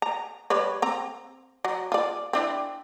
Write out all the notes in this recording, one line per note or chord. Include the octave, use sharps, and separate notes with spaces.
A#5
G3 B4 C#5
C4 A#5
F#3
F4 D5
C4 D4 E4